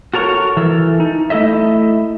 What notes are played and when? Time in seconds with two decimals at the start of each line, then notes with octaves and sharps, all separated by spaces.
0.14 F#4 A4 A#4 C#5
0.57 E3 A4 A#4
1.00 D#4
1.30 A3 E4 A4 D#5 E5